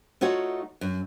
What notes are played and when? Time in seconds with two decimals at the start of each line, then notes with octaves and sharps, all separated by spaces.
0.21 A3 D#4 F4 F#4 C#5 F#5
0.81 F#2